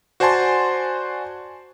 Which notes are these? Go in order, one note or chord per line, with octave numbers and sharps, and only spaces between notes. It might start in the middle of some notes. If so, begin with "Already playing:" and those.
F#4 C5 D5 G#5 A5 C6